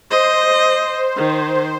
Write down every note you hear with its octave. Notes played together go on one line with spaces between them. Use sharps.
C5 D#5
D#3